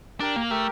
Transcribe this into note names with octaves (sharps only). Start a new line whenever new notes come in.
D4 G4 A#4
A#3
A3 G4 A#4